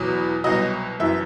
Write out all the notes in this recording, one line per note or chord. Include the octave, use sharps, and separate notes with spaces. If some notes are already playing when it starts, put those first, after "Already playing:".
Already playing: E2 B2 F#3
C2 B2 F#3 D#5
F#1 F#2 E3 E5